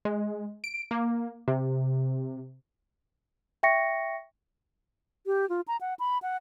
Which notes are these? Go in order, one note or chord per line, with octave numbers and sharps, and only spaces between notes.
G#3
D7
A#3
C3
E5 G5 C#6 A#6 C#7
G4
F4
A#5
F#5
B5
F#5